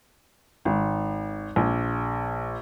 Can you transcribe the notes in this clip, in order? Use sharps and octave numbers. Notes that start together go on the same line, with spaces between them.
G#1
A#1